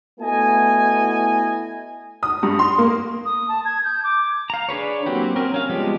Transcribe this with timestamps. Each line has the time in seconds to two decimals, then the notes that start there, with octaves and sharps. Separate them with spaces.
0.20 A3 B3 E4 F#4 D#5 G#5
2.23 D#6
2.43 G2
2.59 C6
2.78 A#3
3.25 D#6
3.49 A5
3.65 G#6
3.84 G6
4.04 D6
4.50 F5 A#5
4.69 D4 G#4 B4 C#5
5.06 F#3 A#3 C4 F#4 G4
5.36 C4 C#4 A#4
5.54 C#4 F5
5.69 F3 G3 G#3 B3 G4